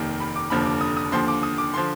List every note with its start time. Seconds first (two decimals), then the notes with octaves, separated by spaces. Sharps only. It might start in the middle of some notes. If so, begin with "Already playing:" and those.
Already playing: F1 D#2 D#3
0.20 B5
0.36 D6
0.50 F1 D#2 D3 F3 B5
0.65 D6
0.81 D#6
0.97 D#6
1.12 D#2 D3 F3 C6
1.28 D6
1.43 D#6
1.58 D6
1.74 D3 F3 C6